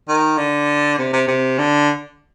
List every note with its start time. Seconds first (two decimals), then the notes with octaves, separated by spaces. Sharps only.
0.08 D#3
0.38 D3
0.99 C3
1.13 C3
1.28 C3
1.58 D3